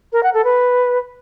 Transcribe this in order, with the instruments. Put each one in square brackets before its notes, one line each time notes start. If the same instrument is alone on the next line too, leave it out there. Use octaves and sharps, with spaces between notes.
[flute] A#4
F#5
A4
B4